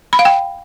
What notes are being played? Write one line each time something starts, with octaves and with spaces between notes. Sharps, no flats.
B5
F5
G5